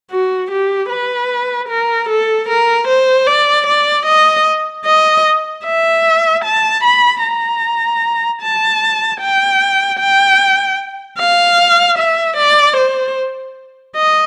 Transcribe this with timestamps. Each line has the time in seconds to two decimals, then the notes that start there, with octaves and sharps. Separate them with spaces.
0.11 F#4
0.51 G4
0.90 B4
1.69 A#4
2.09 A4
2.49 A#4
2.88 C5
3.27 D5
3.67 D5
4.06 D#5
4.86 D#5
5.65 E5
6.45 A5
6.84 B5
7.23 A#5
8.42 A5
9.21 G5
10.00 G5
11.19 F5
11.99 E5
12.37 D5
12.77 C5
13.96 D#5